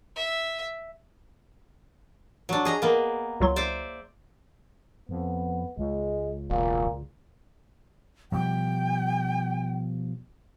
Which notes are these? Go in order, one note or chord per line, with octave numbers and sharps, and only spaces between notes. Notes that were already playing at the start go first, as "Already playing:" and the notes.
E5
F#3 D4
G#4 D#5 A#5
A#3 B3
C#2 F#3 C6
C5 D5 E5
F2 B3
C#2 G#3
E1 A#2
B2 F3 G3 G5